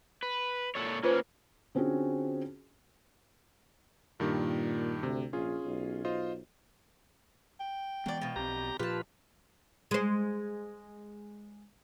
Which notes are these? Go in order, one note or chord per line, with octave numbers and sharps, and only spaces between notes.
B4
A#2 A4 C#5
A#3 C#4 F4 B4 C5
D3 C4 C#4 F4 F#4 G#4
G2 A#2 D#3 G4
D2 C3
A#1 C#4 F4 G#4
B1
F4 C5 D#5
G5
E3 F#3 G#3 B3 D5
B2 F3
B1 C4 G4 A#5
A#2 F3 F4 G4 B4 A5
G#3 C5